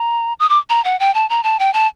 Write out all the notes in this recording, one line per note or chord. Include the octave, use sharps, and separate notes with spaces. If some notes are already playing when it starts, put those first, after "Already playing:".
Already playing: A#5
D#6
D6
A#5
F#5
G5
A5
A#5
A5
G5
A5